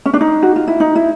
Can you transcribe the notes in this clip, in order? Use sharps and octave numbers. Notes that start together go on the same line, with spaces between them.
C#4
D4
D#4
F#4
F4
E4
D#4
E4